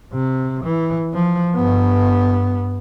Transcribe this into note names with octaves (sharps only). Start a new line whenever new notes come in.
C3
E3
F3
G2 B3